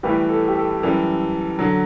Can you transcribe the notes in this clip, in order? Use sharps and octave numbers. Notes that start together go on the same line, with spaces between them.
A2 E3 G3 G4 B4
A4
G4
A4
F#2 E3 G3
D3 F#3